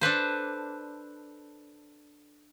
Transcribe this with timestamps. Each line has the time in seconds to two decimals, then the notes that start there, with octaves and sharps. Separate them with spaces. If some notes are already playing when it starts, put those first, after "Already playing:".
0.01 D4 A4 B4 C5